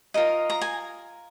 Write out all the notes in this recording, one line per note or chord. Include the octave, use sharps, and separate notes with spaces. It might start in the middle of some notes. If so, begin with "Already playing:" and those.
F4 A#4 D#5
A#5
G#5